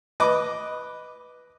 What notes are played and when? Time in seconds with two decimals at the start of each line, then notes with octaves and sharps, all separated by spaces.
0.20 B4 D#5 D6